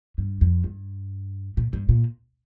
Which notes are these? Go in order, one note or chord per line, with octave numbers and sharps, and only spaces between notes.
G2
F2
G2
A#2
G2
A#2